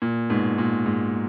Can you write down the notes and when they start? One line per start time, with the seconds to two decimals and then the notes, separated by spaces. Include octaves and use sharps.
0.02 A#2
0.30 G#2 B2
0.58 A#2
0.86 G#2